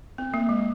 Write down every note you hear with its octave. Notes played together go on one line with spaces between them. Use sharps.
C4
A#3
G#3